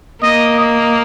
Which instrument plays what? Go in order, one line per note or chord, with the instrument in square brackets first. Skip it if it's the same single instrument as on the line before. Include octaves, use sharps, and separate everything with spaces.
[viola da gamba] A#3 [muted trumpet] D#5
[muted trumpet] D#5